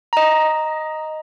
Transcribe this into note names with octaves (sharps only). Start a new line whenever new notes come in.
D#5 A#5